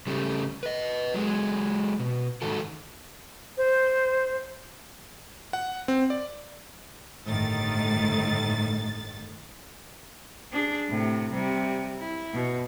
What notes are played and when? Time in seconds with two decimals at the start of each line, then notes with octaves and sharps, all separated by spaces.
0.07 C#3 G3 A3
0.63 B4 D#5
1.14 F#3 G#3 G#4
1.99 B2
2.42 G#2 D#3 F#4 A4
3.57 C5
5.53 F#5
5.88 C4
6.10 D5
7.25 G1 A2 D#3 A6
10.52 D4 G#4
10.89 A2 C3
11.32 C3 G3
11.99 E4
12.33 B2